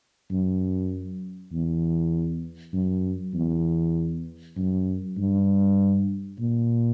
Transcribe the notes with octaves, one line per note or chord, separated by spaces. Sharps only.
F#2
E2
F#2
E2
F#2
G2
A#2